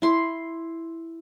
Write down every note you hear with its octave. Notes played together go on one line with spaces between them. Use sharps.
E4 C6